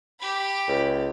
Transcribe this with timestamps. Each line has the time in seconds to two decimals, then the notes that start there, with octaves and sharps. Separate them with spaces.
0.20 G4 B5
0.68 C#2